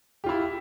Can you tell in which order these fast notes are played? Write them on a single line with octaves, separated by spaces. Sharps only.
G4 F4 E4